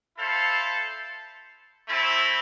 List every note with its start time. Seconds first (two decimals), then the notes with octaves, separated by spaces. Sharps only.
0.17 E4 A4 C5 F5
1.87 A3 C4 E4